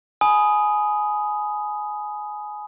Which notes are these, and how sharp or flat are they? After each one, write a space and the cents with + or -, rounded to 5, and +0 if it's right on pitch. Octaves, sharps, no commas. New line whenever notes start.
G#5 +15 B5 +0 D#6 +0